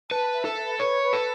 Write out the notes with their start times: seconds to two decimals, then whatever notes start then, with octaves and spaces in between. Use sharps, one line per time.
0.11 B4 A5
0.34 E5
0.45 A4
0.56 B4
0.79 B4 C#5
1.02 B4
1.13 A4